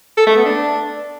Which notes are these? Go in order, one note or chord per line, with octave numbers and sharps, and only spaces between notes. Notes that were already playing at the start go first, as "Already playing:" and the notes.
A4
A3
B3
D4